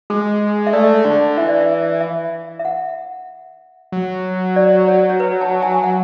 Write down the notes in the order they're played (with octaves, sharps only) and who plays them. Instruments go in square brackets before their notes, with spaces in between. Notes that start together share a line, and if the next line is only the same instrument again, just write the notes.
[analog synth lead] G#3 [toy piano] G#4
[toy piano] E5
[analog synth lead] A3 [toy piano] D5
[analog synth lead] D3
[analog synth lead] E3 [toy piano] E5
[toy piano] D5
E5
E5
E5
F#5
[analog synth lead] F#3
[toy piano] D5
C#5
C#5
B4
A5
G#5
G#5
F#5